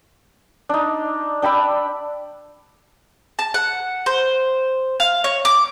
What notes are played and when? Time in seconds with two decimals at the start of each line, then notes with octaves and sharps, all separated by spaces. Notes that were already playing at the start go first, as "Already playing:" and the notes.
0.69 D4 D#4
1.42 D4 G5 B5 E6
3.39 A5
3.54 F#5
4.06 C5
5.00 F5
5.24 C#5
5.45 D6